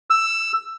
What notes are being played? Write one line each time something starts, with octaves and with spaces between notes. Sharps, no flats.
E6